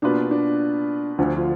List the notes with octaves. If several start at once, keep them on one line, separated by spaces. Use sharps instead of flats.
B2 A#3 D4 F4 B4
D4
D2 D3 F3 F4
F4